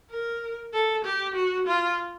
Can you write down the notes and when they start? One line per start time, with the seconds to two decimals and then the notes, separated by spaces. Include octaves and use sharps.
0.10 A#4
0.73 A4
1.05 G4
1.35 F#4
1.67 F4